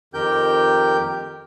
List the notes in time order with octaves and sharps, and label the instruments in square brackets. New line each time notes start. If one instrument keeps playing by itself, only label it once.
[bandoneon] F2 D#3 G4 A#4 G5 G6